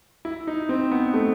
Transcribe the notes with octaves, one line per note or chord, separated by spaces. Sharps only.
E4
D#4
C4
B3
A3